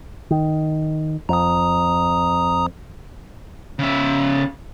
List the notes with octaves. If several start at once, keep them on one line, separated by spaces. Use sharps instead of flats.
D#3
F2 A#5 D#6
C#3 E5